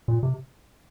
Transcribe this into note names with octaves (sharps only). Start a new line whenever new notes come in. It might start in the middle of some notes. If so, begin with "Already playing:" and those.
A#2
C3